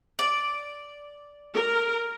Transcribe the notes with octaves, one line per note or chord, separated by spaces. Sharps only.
D5
A#4